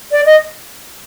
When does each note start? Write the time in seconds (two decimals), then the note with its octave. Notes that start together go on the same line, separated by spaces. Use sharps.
0.12 D5
0.26 D#5